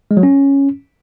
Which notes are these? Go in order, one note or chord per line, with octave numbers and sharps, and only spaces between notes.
G#3
F#3
C#4